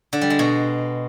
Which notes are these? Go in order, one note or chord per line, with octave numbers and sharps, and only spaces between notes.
D3
G3
G#3
B2